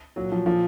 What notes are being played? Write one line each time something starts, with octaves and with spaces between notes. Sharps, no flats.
A#2 F#3
F3
A#2 F3